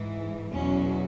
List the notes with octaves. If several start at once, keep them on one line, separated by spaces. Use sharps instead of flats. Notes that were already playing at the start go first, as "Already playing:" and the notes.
Already playing: G#2 E3
E2 B2 F#3 C#4